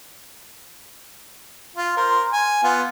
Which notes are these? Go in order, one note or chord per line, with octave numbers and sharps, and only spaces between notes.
F4
A#4 C5
G#5
B3 F4